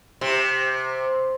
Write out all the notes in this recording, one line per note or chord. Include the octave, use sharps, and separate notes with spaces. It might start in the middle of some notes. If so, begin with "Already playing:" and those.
C3